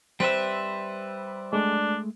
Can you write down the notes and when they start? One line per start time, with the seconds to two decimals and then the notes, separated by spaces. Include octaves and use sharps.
0.20 G3 C4 B4 E5
1.53 G#3 A3 D4